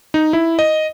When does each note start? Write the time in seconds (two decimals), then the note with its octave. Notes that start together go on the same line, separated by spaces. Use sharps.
0.14 D#4
0.33 E4
0.59 D#5